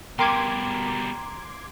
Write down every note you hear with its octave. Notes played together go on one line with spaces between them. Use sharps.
B2 G3 A#4 G5 C6 D6 G#6